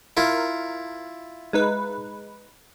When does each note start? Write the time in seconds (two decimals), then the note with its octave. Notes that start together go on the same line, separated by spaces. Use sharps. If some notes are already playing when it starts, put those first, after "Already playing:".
0.17 E4 F4 A#4
1.53 G#3 D#4 B4